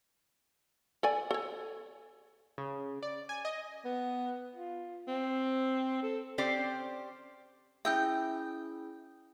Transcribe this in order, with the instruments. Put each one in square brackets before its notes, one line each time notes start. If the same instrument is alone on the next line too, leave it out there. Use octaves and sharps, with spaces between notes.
[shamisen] A4 D5 G#5
A4 C#5
[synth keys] C#3
D5
G#5
D#5
[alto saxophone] B3
F4
C4
A4
[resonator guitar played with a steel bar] C4 C#4 G4 C5 D5
[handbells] C#4 E4 G#4 [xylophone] E5 E6 G6 [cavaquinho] G5